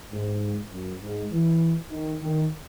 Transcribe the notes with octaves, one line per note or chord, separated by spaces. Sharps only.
G#2
F#2
G#2
E3
D#3
D#3